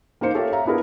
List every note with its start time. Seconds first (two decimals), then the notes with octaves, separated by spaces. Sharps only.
0.21 A#3 D#4 A#4 C5 C#7
0.35 F4 G4 A4 A#4 C#5 E5
0.52 E5 F5 A#5
0.65 B3 D4 E4 G#4 A#4 B4